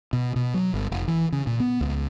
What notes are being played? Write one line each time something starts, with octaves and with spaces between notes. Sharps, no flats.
B2
B2
F#3
G1
F1
E3
C#3
A#2
B3
C#2